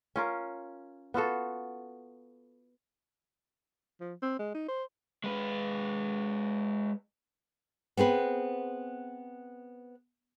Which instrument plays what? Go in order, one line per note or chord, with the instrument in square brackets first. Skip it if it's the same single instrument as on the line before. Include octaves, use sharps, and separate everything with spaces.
[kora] C#4 F4 A#4
B3 F4 F#4 A4
[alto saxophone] F3
C4
G#3
D#4
C5
[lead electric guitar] G#3 B4
[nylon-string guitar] B3 C4 G#4 B4